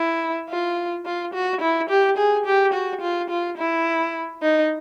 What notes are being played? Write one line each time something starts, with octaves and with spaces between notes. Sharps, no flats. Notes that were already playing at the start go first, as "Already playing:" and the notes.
Already playing: E4
F4
F4
F#4
E4
G4
G#4
G4
F#4
F4
F4
E4
D#4